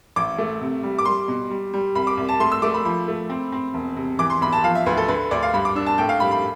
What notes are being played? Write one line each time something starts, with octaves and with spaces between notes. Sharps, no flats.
A1 D6
A3
C3
G3
D6
G3 C6
B2
G3
G3
C2 B5
D6
C2
A5
A3 C6
E6
A3 D6
B5
F3 B5
A3
C4
C4
E1
C3
E3 D6
C6
B1 B5
A5
F3 F5
E5
D2 B4
A4
D3 B4
D2 D5
F5
G2 B5
D6
D4 E6
A5
A2 G5
F5
G3 B5
B5